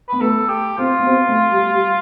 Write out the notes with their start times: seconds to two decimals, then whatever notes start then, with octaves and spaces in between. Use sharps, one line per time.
0.09 B3 B4
0.20 A3 A4
0.49 G4
0.78 C4 F4
1.00 B3
1.07 C4
1.29 A3
1.51 G3
1.72 G3